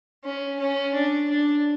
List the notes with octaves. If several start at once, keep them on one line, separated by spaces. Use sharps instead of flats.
C#4
C#4
D4
D4